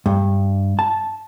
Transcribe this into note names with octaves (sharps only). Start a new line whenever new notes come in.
G2
A5